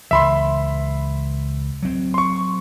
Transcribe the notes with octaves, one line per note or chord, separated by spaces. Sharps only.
C#2 E3 E5 B5 C6
F#3 C4
C6 C#6